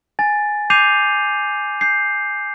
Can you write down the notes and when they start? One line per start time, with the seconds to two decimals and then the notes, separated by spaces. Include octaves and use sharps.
0.19 G#5 A6
0.70 D6 G6 C7 D#7 F7
1.81 G6 C7